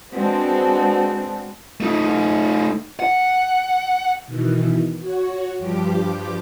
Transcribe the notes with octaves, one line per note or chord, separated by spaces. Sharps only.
G#3 B3 C4 D4 F#4
A3 D#4
F#5
B2 D#3 E3
F#4 C#5
G2 F3 G4 D6